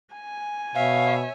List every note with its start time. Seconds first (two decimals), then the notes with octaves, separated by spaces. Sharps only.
0.14 G#5
0.75 B2 C#5 E5 F5